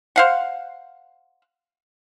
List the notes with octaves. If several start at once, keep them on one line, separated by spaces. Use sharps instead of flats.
C5 F5 F#5